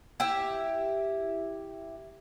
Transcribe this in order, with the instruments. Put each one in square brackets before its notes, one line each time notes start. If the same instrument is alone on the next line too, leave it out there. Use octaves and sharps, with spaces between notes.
[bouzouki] E4 G4 E5